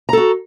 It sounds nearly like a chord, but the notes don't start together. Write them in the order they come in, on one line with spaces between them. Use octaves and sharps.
A#5 A4 F#4